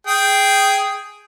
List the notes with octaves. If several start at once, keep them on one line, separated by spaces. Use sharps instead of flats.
G#4 G5